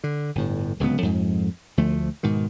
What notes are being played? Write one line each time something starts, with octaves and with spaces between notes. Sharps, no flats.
D3
G1 A2
D1 C#2 D3 B3
F2 G#2
D2 F3 A3
G#2 B2 D#3